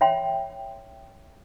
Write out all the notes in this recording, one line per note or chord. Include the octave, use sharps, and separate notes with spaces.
C#5 E5 G5 C6